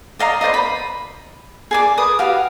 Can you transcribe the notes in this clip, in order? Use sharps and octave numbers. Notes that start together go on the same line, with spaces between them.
D5 D#5 F5 A#5
B4 C5 D5 D#5
B5
G#4 D5 D6
B4 D#6
F#4 G4 F5